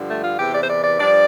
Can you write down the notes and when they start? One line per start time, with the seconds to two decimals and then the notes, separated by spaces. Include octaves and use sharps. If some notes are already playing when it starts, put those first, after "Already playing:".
Already playing: G2 D3 F3
0.09 A3
0.24 F4
0.39 E2 C3 E3 G4
0.54 D5
0.63 C5
0.68 D5
0.84 D5
0.99 G2 F3 D5